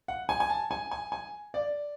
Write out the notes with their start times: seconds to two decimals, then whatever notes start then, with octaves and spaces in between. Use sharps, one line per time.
0.08 F#5
0.29 G#5
0.40 G#5
0.50 A5
0.71 G#5
0.91 G#5
1.12 G#5
1.54 D5